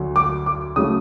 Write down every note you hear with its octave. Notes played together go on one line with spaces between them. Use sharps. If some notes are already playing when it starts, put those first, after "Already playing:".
Already playing: D2 D3 F#3
D6
D6
C#3 F#3 A3 D#6